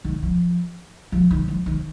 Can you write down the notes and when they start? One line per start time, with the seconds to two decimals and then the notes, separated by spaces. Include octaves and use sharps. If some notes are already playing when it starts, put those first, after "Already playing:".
0.04 D#3
0.23 F3
1.12 F3
1.31 D#3
1.48 F3
1.66 D#3